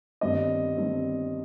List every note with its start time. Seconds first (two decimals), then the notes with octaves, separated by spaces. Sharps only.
0.21 G1 G2 D#3 G3 C4 D#5
0.77 G1 G2 D#3 G3 C4